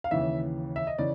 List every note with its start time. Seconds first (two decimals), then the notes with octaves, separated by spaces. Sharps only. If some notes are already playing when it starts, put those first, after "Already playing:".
0.04 F5
0.11 D#2 C#3 E3 E5
0.76 E5
0.87 D#5
0.98 C#3 E3 D5